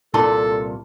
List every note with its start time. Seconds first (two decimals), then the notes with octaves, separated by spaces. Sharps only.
0.14 C2 A#2 E4 A4 A5 C6